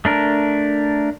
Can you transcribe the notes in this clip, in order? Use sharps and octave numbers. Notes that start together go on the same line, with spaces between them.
A3 D4 A#4